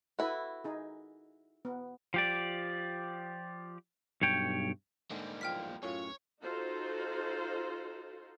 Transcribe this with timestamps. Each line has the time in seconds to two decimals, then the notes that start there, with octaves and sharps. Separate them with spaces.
0.19 E4 F#4 A4 B4
0.64 D#4 G#4
1.65 B3
2.14 F3 G4 D5
4.22 B1 G2 C#5 G5
5.11 G#2 D3 G3 G#3 A#3
5.41 E2 F3 F4 G5 F6 B6
5.83 F#2 A2 C#4 F4 C#5
6.42 D#4 F4 F#4 A4 C5